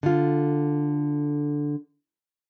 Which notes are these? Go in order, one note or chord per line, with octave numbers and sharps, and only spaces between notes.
D3 F4